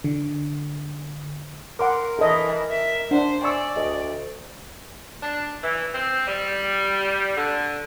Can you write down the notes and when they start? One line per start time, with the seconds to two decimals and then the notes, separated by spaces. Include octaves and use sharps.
0.04 D3
1.79 A#4 F#5 C6 D6
2.19 E3 A4 D#5
2.71 E5
3.11 D4 C5 F#5
3.42 D5 G#5 C#6 E6
3.76 D2 D#5
5.23 D4
5.63 E3
5.93 C4
6.26 G3
7.36 D3